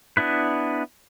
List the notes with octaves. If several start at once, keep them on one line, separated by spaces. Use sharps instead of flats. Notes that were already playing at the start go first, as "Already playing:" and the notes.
B3 D4 E4 B4